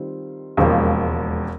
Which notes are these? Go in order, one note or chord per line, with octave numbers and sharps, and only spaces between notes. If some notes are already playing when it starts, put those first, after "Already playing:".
Already playing: D#3 G3 C4 F4
E1 D#2 C#3 F3 G#3